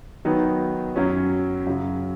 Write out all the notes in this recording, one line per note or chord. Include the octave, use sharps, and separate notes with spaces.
D#3 F#3 B3 D#4
F#2 F#3 C#4
F#2 C#3 F#3